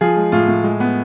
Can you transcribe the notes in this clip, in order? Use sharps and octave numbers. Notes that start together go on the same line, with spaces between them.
F3 F4 G#4
G#3
A2 F4
A2
G#3
B3